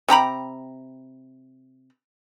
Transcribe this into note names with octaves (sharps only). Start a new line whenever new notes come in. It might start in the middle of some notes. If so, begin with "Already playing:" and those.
C3 G5 A#5 B5